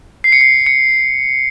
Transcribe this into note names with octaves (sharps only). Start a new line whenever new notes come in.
C7
C#7
C7
C#7